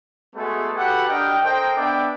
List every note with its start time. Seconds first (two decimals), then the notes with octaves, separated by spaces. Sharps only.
0.35 G#3 A3 B3 F#4 G#4 A4
0.75 F#4 G4 A4 B4 F#5
1.08 D4 G4 A#4 D#5 G5
1.42 A4 A#4 C5 D#5 G5
1.76 B3 D4 D5 E5 G5 D6